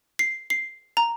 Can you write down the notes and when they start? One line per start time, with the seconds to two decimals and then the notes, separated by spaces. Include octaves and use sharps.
0.19 C7
0.50 C7
0.97 A#5